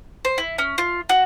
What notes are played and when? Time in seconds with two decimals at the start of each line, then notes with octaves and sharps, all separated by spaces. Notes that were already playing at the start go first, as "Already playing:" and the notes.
0.25 C5
0.38 E4
0.58 C#4
0.78 F4
1.09 F#4